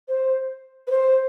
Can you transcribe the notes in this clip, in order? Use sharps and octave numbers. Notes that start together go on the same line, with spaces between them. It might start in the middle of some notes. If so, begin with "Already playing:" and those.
C5
B4
C5